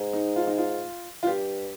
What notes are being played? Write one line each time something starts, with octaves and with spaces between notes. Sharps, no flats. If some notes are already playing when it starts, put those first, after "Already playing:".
Already playing: G#2
D#4
F4
D#4
F4
F4
G2 G4